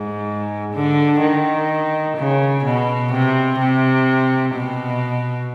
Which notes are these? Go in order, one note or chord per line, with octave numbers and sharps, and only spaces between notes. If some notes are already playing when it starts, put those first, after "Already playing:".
Already playing: G#2
D3
D#3
C#3
B2
C3
C3
B2